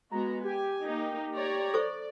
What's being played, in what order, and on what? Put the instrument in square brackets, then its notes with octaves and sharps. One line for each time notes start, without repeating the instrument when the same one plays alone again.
[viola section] G#3 B3 F#4 [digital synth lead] A#5
[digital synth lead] G4 [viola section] G#5
[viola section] A#3 D#4
C#5 D5 A#5
[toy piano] A4 C5 C#6 [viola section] D5